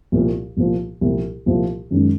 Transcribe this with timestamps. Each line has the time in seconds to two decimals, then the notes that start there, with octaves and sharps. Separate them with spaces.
0.12 C2 A#2 F3
0.57 C2 A#2 F3
1.01 C2 A#2 F3
1.46 C2 A#2 F3
1.91 F#2 D#3 G#3 C#4